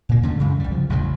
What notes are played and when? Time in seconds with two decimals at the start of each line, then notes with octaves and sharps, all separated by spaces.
0.09 A#2 A#3
0.23 E2 D3 A3 C#4
0.37 F#2 C#3 E3 G#3
0.60 C2 G3
0.71 C#3 F3
0.90 A1 E2 C#3 F#3